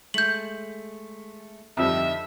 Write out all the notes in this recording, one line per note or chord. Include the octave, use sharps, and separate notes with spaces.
G#3 A3 G6 F#7
F2 D3 F3 G3 D#4 E5